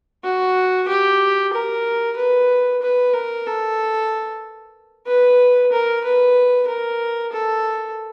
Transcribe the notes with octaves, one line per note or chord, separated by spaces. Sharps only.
F#4
G4
A#4
B4
B4
A#4
A4
B4
A#4
B4
A#4
A4